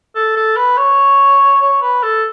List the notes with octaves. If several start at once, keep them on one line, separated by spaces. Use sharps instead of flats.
A4
A4
B4
C#5
C#5
B4
A4